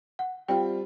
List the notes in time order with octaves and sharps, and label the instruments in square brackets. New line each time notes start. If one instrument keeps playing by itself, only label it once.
[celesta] F#5
[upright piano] G3 C4 F4 [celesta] G5